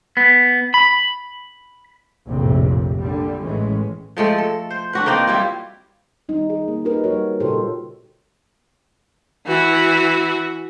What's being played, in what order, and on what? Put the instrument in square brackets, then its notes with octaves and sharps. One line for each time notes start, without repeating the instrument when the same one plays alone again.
[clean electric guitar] B3
B5
[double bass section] F1 A#1 F2 A2 C3
A#2 D3 G3
A1 A2 E3 G#3 C#4
[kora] F3 G#3 A3 A4
A4
C5
D4 F#4 B4
A#3 C4 D#4 D5
G3 E4 F4
[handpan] G3 D#4
G#4
A#3
D#4 G4 A#4 B4
G3 F#4 C#5
A#2 C#3 F4 G4 A4 C5
[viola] E3 F#4